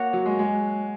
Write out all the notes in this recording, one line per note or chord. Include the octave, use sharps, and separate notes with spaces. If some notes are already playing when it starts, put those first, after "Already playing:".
Already playing: A#3 F#4 C#5 F#5
F#3
G#3
G#3